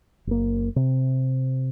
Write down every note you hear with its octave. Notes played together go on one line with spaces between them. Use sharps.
F#1 A#3
C3